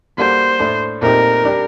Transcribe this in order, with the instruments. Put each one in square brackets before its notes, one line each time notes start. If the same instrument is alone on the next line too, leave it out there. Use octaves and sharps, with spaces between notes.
[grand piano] G3 A#3 F#4 A4 [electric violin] C5
[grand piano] A2 A3 D4 A4
[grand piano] A#2 A3 C4 D#4 G4 [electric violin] A#4
[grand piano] G3 D4 G4